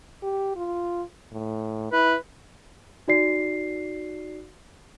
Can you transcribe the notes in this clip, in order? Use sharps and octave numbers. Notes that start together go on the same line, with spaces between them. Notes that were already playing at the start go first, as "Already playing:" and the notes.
G4
F4
A2
E4 B4
D#4 F#4 D5 C7